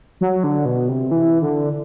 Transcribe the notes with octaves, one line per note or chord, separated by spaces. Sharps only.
F#3
D3
B2
C3
E3
D3